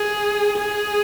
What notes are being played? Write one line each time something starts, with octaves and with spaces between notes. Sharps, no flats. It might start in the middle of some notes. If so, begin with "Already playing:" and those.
Already playing: G#4
G#4